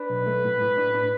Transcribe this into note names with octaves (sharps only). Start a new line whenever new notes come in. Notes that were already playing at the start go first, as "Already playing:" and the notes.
Already playing: D4 B4
B1
A3
A2
A2
D4
D4